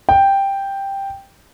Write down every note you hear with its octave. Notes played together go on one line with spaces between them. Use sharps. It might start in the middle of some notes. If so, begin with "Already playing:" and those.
G5